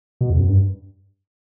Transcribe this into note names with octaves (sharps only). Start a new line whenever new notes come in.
B2
E2
F#2
G2